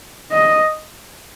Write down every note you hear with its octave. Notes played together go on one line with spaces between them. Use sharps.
D#5